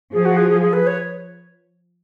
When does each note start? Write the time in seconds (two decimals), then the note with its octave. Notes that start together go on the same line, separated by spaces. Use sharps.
0.13 F3 G#4
0.25 F#4
0.37 G#4
0.49 G#4
0.61 G#4
0.73 B4
0.87 C#5